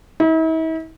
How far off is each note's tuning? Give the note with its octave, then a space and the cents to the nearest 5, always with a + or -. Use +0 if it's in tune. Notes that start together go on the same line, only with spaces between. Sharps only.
E4 -45